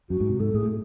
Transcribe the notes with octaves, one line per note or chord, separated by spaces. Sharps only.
F#2 F#4
G#2
C3
G#2 A4
A2 G#4